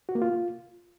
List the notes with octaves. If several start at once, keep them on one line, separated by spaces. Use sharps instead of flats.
F#4
A#3
F4